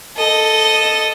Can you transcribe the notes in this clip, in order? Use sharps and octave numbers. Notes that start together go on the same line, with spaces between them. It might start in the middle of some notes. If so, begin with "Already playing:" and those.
A4 D#5